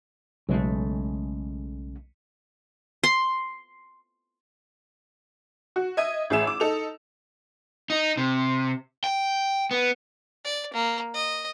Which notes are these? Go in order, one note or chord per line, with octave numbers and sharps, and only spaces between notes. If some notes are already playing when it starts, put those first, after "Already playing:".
B1 C#3 G#3 A3
C6
F#4
D#5 E5 G#6 D#7
A1 G#4 E5 E6 E7
D6
D#4 A4 F7
D#4
C3
G5
B3
D5
A#3
D#5